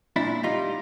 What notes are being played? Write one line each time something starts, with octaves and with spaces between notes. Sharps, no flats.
A#2 D4 E4
G3 D#4 F4